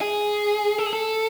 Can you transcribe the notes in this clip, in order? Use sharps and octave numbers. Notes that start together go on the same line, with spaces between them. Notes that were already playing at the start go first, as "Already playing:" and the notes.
G#4
A4
G#4
A4